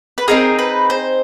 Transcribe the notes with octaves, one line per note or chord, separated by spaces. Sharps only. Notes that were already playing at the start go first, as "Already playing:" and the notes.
B4
C4 D#4 G#4 A#4
B4
C5